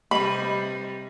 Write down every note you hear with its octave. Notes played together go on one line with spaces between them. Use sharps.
C3 G3 D#4 B4 B5